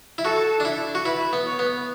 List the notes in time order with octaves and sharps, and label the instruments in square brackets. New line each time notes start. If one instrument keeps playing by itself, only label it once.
[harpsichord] E4
[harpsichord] F#4 [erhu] A4
[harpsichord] D4
E4
F#4
[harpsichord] E4 [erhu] B4
[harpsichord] B3
[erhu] C#5
[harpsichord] B3